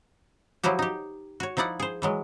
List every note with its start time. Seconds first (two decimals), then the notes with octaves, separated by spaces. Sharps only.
0.63 F3 F#3 E4 F#4 G4
0.79 D#4 G4
1.40 F#4 C#5
1.57 F3 D#4 E4 D5 F#5
1.80 G#4 C5
2.02 E3 F#3 G#3